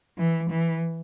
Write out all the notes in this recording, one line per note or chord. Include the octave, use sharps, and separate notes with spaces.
E3
E3